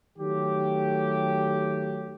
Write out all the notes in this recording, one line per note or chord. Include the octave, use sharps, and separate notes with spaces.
D#3 F#3 A3 G4